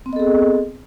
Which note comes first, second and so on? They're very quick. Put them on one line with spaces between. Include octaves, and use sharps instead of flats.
C4 B3 D#5 A4 G#4